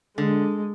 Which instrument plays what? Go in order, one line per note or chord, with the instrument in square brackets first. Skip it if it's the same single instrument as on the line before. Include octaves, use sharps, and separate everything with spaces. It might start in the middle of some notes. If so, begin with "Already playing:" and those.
[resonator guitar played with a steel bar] D3 [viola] G#3